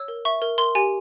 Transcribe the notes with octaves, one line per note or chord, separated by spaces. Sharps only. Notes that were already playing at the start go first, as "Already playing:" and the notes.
Already playing: C#5 E6
A#4
E5 C#6
A#4
A#4 C6
G4 G#5